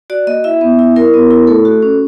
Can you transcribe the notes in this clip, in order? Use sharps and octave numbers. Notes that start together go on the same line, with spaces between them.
F#4 D5
A#3 D#5
E4 E5
B3
E4
E4 A#4
B3
E4
A3 A4
F#4
C#4